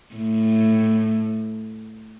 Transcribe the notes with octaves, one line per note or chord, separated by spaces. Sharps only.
A2